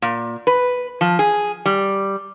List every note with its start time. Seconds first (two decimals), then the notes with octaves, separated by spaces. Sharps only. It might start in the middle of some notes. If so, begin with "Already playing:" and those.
0.02 A#2
0.47 B4
1.01 F3
1.19 G#4
1.66 G3